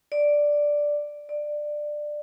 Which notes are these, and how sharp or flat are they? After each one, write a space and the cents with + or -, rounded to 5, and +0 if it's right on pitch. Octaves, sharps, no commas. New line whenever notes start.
D5 +0
D5 +15